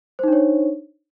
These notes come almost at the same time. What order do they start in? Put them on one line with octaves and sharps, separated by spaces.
C5 D#4 D4 C#5